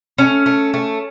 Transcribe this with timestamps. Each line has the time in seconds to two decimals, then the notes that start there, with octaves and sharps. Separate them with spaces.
0.18 A3 C#4
0.46 A3
0.74 A3